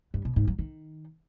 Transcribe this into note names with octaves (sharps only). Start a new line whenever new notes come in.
G2
B2
G#2
F#3
D#3